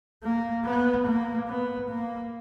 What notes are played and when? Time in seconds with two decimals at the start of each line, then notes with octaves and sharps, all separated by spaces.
0.23 A#3
0.65 B3
1.06 A#3
1.48 B3
1.89 A#3